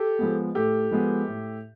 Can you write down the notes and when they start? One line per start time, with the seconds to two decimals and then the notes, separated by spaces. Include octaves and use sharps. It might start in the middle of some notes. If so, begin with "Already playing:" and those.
Already playing: G4 A4
0.19 F3 G#3 B3
0.55 A2 G4 A4
0.91 F3 G#3 B3
1.27 A2